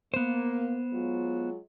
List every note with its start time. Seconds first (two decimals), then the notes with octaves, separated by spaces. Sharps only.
0.14 A#3 B3 C5
0.93 F#3 G#3 F4